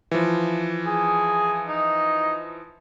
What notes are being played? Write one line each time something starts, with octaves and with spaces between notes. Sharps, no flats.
E3 F3
G#4
D#4